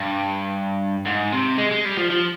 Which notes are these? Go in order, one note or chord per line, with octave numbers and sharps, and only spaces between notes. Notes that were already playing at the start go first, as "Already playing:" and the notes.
Already playing: G2
G#2
C3
G#3
G#3
G3
F3
F3